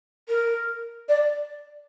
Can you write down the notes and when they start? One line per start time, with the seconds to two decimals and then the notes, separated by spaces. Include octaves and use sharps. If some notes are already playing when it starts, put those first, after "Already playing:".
0.29 A#4
1.08 D5